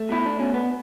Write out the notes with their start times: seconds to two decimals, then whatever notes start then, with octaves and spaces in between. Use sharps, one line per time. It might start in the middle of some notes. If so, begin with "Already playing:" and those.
Already playing: A3
0.09 B2 E4
0.26 D4
0.39 B2 C#4
0.54 B3